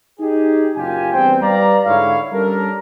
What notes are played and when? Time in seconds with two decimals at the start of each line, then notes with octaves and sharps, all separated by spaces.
0.20 D#4 G4 G#4
0.76 F#1 A#2 F4 G4 G#5
1.12 E2 G2 C4 C5 G5
1.41 G3 B4 D5 F5 A#5
1.85 G#2 D3 E4 C#5 F5
2.33 G3 C#4 D4 A4 A#4